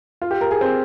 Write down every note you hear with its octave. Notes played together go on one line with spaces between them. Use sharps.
F4
G4
A#4
G#4
C4